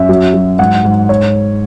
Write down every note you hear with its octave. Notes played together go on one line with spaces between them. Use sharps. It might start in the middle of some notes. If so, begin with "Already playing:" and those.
Already playing: F#2 E5
F#3
F#3
G#2 F#5
G#2
C#5